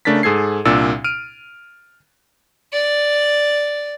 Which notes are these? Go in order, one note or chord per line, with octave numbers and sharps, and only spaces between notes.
C#3 A3 D4 A#4 A6 B6
G#2 G#4 A4 G#6 C7
C2 A#2 D4 E6 A6
F6 D7 D#7
D5